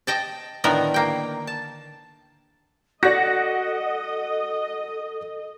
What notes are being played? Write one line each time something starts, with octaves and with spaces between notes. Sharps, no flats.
D#5 G5 A5
A2 D3 D#3 B3 A#4 D#5
A#3 G5
A5
F#4 A4 D5 D#5 F#5 A#6